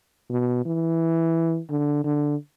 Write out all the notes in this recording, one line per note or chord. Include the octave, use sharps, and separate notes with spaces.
B2
E3
D3
D3